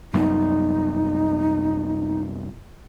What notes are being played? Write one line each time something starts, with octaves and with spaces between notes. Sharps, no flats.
C2 F#2 B3 D#4